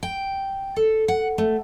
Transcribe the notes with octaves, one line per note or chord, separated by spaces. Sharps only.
G5
A4
F#5
A3